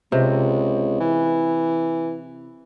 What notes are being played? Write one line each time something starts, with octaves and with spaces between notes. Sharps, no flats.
C#2 C3
E3